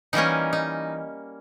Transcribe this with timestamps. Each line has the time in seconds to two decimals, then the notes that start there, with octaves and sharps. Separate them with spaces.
0.13 E3 G3 A#3 C#4 D#4
0.53 D#4